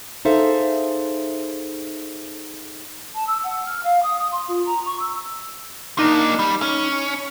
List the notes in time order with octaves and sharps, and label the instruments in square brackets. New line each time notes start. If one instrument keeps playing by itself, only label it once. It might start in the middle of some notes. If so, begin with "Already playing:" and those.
[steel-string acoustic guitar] D#4 G#4 A4 C5 E5 F5
[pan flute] A5
E6
F#5
F6
F5
D#6
D#6
C6
F4
A#5
C#6
E6
[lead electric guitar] A#3 D4 [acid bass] D#4
[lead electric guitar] G3
C#4